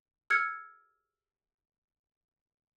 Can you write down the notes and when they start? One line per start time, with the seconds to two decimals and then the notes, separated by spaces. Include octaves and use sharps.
0.30 E6 F6 G#6 C#7